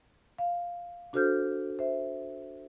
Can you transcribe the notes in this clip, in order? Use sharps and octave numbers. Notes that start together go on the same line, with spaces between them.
F5
D4 F#4 A4 C5 F6 G6
C5 E5